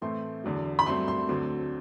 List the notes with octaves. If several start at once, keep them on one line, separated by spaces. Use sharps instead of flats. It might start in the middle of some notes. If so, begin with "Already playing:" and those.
A2 E3 A3 C4 C6
E2 D3 F#3
B5
G2 F#3 A3 C4 C6
C6
D2 D3 F#3 C4